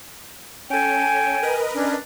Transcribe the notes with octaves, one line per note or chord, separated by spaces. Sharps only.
C#4 A4 G5 G#5
A#4 B4 D#5
C#4 D4